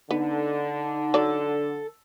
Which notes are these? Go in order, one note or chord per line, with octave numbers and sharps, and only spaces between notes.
D3 B3 D#4
F#3 A4 D5